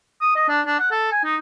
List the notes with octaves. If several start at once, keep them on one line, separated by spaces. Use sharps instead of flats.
D#6
D#5
D4
D4
F#5
A4
G#5
D#4